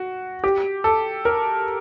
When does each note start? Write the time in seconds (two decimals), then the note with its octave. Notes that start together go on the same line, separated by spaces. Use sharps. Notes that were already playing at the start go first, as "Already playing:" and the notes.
Already playing: F#4
0.44 G4
0.84 A4
1.25 A#4